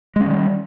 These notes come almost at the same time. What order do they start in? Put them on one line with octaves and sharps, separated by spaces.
G#3 C#4 D#3 G3